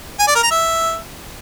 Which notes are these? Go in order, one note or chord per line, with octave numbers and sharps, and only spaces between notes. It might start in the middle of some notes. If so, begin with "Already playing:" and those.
G#5
D5
A#4
A#5
E5